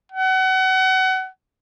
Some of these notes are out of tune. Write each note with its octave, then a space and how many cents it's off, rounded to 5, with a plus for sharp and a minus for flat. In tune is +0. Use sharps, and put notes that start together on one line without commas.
F#5 +30